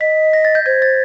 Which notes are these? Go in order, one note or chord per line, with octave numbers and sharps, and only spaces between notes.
D#5 B6
A#6
A6
G6
C5 G#6
A6